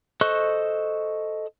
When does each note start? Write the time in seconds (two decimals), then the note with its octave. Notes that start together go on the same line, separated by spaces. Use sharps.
0.21 A4 C5 D#5 C#6 F#6